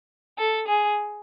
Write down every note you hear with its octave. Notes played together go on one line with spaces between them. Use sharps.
A4
G#4